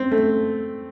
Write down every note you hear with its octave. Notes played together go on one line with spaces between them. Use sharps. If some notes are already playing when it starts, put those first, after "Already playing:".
Already playing: C4
A3